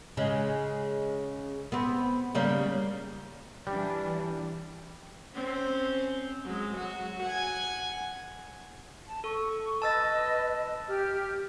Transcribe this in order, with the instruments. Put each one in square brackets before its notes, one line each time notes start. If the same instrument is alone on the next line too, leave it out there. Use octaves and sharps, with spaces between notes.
[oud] C#3 G#3
B3 C4
C#3 G3 A#3
[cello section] E3 D4 [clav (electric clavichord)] G3
[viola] C4 C#4
F#3 G#3
F#3 F#4
F#5 G#5
[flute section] A5
[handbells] A4 [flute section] C#6
[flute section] B4 D#5 [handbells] A5 E6 A6
[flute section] G4 F6